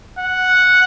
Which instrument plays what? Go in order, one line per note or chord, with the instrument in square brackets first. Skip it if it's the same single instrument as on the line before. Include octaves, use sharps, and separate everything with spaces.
[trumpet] F#5